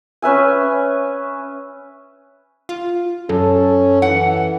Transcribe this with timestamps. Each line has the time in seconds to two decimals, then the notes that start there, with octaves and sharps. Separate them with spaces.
0.22 C#4 B4 E5 G#5
2.69 F4
3.29 F#2 C#4 A4
4.02 E3 F#5